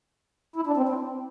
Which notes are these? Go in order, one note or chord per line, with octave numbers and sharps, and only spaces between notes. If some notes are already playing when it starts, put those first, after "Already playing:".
E4
D4
C4
C4